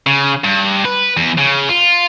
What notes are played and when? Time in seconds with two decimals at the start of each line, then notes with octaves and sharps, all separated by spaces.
0.07 C#3
0.44 G2
0.85 B4
1.17 E2
1.38 C#3
1.69 F4